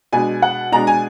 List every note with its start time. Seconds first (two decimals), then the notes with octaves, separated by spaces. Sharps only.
0.13 B2 G#3 D4 G#5
0.42 F#5
0.72 B2 G#3 D4 A#5
0.87 G#5